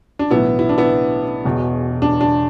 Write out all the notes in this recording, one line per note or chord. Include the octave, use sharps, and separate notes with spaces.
D4
B1 A2 E3 B3 E4
E4
D4
B3 E4
E1 E2 B2
D4
D4